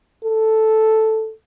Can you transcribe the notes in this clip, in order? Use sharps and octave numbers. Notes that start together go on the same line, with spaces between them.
A4